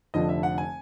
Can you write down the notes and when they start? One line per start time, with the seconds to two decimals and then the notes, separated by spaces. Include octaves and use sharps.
0.14 F1 F2 D3 F3 D#5
0.29 E5
0.43 F#5
0.58 G#5